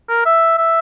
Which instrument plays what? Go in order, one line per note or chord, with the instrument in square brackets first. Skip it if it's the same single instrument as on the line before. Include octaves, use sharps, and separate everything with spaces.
[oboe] A#4
E5
E5